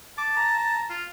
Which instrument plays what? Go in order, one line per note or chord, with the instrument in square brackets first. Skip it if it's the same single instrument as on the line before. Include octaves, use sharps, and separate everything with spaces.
[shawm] A5 [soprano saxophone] D6
[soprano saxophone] A#5
[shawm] F4